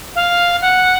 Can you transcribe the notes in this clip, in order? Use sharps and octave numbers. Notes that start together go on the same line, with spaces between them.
F5
F#5